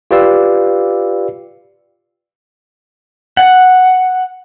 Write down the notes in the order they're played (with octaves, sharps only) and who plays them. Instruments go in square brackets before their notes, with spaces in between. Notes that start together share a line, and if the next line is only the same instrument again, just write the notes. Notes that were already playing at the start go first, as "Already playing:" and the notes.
[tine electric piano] F4 G4 B4 D5 F5 E6
[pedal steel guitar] F#5